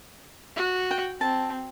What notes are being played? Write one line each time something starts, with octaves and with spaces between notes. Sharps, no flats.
F#4
G5
C4 A5